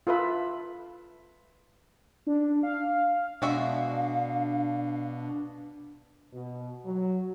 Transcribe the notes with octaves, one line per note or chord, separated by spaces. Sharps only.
F4 A4 B4 E5 B5
D4
F5
B2 G#3 D4 F#4 E5 F5
B2
F#3